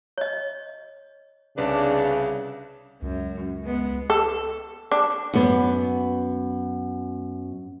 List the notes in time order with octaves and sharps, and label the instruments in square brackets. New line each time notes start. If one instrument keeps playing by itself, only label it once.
[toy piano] C#5 D#5
[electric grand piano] C2 B4 [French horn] C#3 [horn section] D4
[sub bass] C#2 [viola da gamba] F#2
[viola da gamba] G#3 B3
[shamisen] A4
D4
[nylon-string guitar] F#2 B3